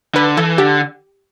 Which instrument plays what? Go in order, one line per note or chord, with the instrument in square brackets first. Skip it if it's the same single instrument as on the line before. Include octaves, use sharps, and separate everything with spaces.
[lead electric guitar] D3 [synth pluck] B4
[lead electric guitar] E3 [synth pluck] A4
[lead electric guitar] D3 [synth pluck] G4